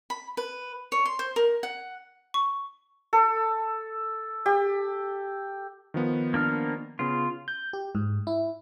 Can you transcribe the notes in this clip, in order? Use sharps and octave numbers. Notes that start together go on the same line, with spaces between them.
B5
B4
C#5
C6
C5
A#4
F#5
C#6
A4
G4
D#3 F3 B3
A#3 D4 F6
C#3 B3 F4
G6
G4
G#2
E4